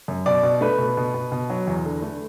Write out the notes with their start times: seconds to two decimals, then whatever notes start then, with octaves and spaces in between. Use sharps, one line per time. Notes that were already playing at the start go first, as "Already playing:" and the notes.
0.08 F#2
0.26 B2 D5
0.43 B2
0.61 A3 B4
0.78 B2
0.97 B2
1.14 B2
1.32 B2
1.50 F#3
1.67 E2
1.85 D3
2.02 A3